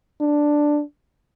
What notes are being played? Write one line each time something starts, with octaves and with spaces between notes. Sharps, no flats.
D4